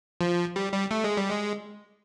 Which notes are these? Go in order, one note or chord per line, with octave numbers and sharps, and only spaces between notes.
F3
G3
G3
A3
G#3
G3
G#3